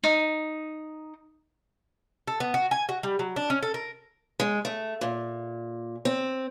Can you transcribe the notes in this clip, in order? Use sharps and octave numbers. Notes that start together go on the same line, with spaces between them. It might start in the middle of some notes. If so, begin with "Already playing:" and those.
D#4
A4
B3
F#4
G#5
F#4
G3
F#3
D4
C#4
A4
A#4
G#3
A3
A#2
C4